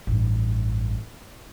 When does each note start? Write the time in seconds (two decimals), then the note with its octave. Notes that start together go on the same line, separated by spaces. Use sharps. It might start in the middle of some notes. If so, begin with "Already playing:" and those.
0.07 A1 G2